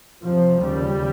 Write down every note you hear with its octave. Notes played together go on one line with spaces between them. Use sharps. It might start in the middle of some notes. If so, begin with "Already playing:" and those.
F2 C3 F3
D#2 C#3 G3